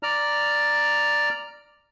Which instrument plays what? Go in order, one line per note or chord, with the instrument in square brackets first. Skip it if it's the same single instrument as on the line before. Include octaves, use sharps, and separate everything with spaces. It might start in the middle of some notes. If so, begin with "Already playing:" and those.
[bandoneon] D5 A#5 F6